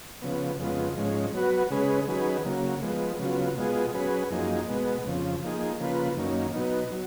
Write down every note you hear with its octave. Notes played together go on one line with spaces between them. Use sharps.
C#3 F3 B3
F2 C#3 G#3 B3 F4
G#2 F3 G#3 C#4
F#3 B3 F#4 B4
C#3 G#3 C#4 G#4 B4
D#3 F#3 C#4 G#4 B4
C#3 F#3 A#3
F3 G#3 B3
C#3 F#3 B3 F4
B2 G#3 B3 F4 G#4
F#3 C#4 G#4 B4
F#2 F3 A#3 D#4 G#4
B2 G#3 B3
F2 C#3 F3
F3 A#3 D#4 G#4
C#3 F3 A#3 F4 B4
F#2 D#3 A#3 C#4
B2 F#3 B3 D#4
F#3